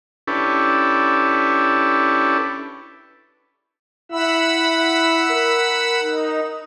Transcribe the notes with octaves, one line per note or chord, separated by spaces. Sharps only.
C#4 D4 E4 G4 A4 B4
E4 F#5 B5 E6
A#4
D#4